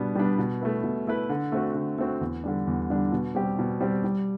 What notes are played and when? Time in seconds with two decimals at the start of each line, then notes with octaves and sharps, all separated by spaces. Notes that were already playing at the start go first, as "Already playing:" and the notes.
Already playing: B2 G3 B3 D4
0.15 G3 B3 D4
0.39 B2
0.61 A3 E4 B4
0.84 B2
1.07 A3 E4 B4
1.29 D3
1.52 A3 C4 F#4
1.75 D3
1.98 A3 C4 F#4
2.21 E2
2.44 D3 G3 D4
2.67 E2
2.90 D3 G3 D4
3.12 B2
3.35 G3 C4 G4
3.59 B2
3.81 G3 C4 G4
4.04 G3